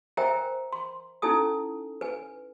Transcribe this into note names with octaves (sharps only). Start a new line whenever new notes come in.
A#4 C5 E5 G5 G#5 A#5
C6
C#4 D#4 E4 A4 G#5 D#6
B4 G#5